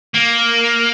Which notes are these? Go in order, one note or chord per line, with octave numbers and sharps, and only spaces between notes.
A#3